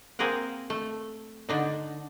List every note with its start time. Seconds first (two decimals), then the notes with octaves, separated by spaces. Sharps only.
0.19 A#3 C4 G#4 A#4 F#5
0.70 A3
1.49 D3 D4 D#4